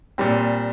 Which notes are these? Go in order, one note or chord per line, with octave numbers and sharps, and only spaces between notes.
A#2 G3 C4